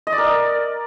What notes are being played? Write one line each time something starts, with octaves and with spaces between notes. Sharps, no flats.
D#5
D5
A#4
D5